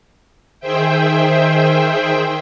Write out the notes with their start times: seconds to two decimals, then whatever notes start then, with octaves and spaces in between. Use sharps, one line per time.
0.60 D#3 G#4 C5 E5 G5